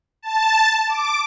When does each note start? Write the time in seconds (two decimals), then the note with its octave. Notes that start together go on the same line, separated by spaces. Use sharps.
0.22 A5
0.88 D6